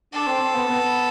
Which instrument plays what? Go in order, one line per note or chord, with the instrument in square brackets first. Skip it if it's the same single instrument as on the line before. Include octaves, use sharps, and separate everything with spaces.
[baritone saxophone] D4 [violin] A4
[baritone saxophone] C4
C4
B3
B3